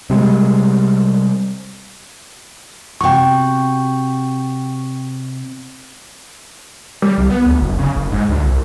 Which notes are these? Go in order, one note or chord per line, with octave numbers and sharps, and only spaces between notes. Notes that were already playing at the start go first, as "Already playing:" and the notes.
C3 G3 G#3
C3 F#4 G5 C#6
G3
C2
B3
D2
F#1
C#3
F#1
G#2
D2
C2